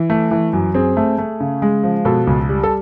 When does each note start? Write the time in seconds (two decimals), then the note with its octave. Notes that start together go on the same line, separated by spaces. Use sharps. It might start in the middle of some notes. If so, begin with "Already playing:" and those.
Already playing: E3
0.10 A3
0.31 E3
0.53 F#2
0.74 C4 G#4
0.97 A3
1.18 A3
1.40 C#3
1.62 G#3
1.83 F3
2.05 B2 A4
2.27 C#2
2.49 G3
2.63 A4